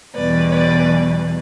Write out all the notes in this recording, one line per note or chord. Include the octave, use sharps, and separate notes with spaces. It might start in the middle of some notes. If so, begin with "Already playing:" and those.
E2 B2 G3 B4 D5
B4 D5